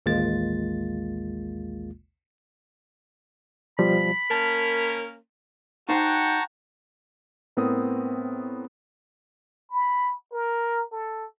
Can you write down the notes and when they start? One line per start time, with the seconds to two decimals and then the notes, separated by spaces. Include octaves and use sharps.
0.06 A1 D#2 G#3 A#3 F4 A6
3.79 B2 F3 G3 B5
4.31 A#3 C#4 A#4 A5
5.89 D#4 F#4 C5 F#5 G5 A5 A#5 C#6
7.57 A2 B3 C4 A#4 D#6
9.70 B5
10.32 A#4
10.92 A4